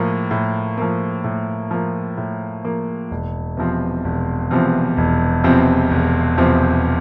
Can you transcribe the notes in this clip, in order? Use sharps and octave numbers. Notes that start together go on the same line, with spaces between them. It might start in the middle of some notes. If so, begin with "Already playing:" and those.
Already playing: A2 F3 A#3
A2
F3 A#3
A2
F3 A#3
A2
F3 A#3
E1
E2 C3 F3 C4
E1
E2 C3 F3 C4
E1
E2 C3 F3 C4
E1
E2 C3 F3 C4